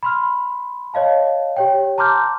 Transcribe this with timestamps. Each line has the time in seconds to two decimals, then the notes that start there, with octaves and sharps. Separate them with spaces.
0.03 B5 C6 F6
0.94 C#5 D#5 F5 A5
1.57 G4 C#5 G5
1.98 A5 A#5 C6 D6 F6 G6